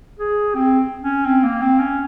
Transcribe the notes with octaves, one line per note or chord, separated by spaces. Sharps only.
G#4
C4
C#4
C4
A#3
C4
C#4